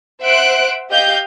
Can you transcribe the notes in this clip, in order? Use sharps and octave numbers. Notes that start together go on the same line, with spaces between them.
C5 E5 F#5 F#6 D7
G4 D#5 F5 G6